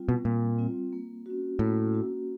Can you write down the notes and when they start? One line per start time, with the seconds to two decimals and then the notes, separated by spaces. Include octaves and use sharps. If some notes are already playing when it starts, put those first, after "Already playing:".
Already playing: G3 C4 F4
0.09 B2
0.24 A#2 G3
0.58 C4 F4
0.93 A#3
1.26 C#4 F#4
1.59 A2 A#3
1.93 C#4 F#4